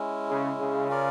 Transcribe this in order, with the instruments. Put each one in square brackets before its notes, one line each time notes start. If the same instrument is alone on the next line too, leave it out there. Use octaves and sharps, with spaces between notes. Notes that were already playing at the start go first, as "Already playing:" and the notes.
Already playing: [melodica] G#3 C#4 E4
[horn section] C#3
C#3
[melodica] C#4 F4 A#4 D5